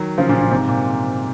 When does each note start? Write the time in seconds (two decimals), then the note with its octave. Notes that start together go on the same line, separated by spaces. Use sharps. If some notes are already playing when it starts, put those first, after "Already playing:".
Already playing: D#3 F#3
0.18 C#3 F3
0.29 A#2 C#3
0.41 A#2 C#3
0.51 G#2 C3
0.69 A#2